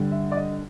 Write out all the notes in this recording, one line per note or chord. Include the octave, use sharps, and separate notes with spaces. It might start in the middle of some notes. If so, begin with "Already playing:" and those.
Already playing: G2 D3 G3
E5
D5
D#5